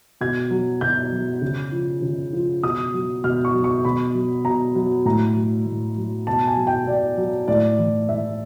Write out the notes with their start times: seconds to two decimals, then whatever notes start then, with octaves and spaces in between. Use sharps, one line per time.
0.21 B2 G#6
0.51 F#3
0.81 B2 G6
1.12 F#3
1.42 C#3
1.72 F3
2.02 C#3
2.33 F3
2.63 B2 D#6
2.94 F#3
3.24 B2 F6
3.45 C#6
3.54 F#3
3.64 C#6
3.85 B2 B5
4.14 F#3
4.45 B2 A#5
4.75 F#3
5.05 A2 A#5
5.36 F#3
5.67 A2
5.97 F#3
6.27 B2 A5
6.47 G#5
6.57 F#3
6.67 G5
6.87 B2 D5
7.17 F#3
7.48 A2 D5
7.79 E3
8.09 A2 E5